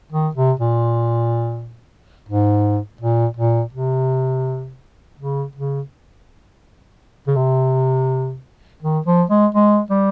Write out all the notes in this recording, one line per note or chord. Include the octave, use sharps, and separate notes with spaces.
D#3
C3
A#2
G#2
A#2
A#2
C3
C#3
C#3
C#3
C3
D#3
F3
G#3
G#3
G3